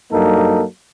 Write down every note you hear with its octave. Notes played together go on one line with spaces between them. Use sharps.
G2 F#3 A#3 D#4 A4